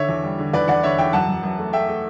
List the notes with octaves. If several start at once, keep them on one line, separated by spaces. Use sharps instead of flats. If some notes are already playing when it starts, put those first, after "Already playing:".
Already playing: D3 C#5 E5
E2
G3
D3
E2 B4 D5
E2 D5 F#5
D3 C#5 E5
E2 E5 G5
F#2 F#5 A5
F#2
F#2
A3
A3 E5 G5
A3